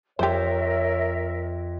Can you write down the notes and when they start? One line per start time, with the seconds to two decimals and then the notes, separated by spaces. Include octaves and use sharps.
0.19 F2 G4 A#4 C5 C#5 E5 G6 A6